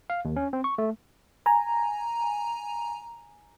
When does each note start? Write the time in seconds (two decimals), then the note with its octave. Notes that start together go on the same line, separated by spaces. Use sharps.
0.10 F5
0.25 D#2
0.36 C#4
0.53 C4
0.64 C#6
0.78 A3
1.46 G#5 A#5